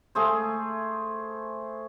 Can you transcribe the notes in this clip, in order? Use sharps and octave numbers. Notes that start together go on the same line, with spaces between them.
A3 G#4 C5